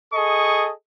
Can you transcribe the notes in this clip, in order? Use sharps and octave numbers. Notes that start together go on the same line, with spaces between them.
G#4 A4 D#5 C#6